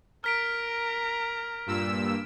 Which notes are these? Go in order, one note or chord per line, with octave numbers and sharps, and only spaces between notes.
A#4 A#5 F6 B6 D7
G2 A#2 E6